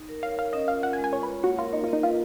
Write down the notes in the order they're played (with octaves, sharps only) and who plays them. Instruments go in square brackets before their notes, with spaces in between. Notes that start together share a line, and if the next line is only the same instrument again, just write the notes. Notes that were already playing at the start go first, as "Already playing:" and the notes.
Already playing: [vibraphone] D#4
A#4
[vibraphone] C#5 [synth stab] F5
[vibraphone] A#4 [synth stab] F5
[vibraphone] C#4 [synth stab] D#5
[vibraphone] F4 [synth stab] F5
[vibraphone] F4 [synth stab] F#5
[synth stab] G#5
[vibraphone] G#3
[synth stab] G#5
[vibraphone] F4 [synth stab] C#5
[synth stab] B4
[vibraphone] C#5
[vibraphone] A#3 [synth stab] F#4
[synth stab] F4 [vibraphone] A#4
[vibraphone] A#3 [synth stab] D#4
[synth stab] F4 [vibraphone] D#5
[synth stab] D#4
[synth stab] F4 [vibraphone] B4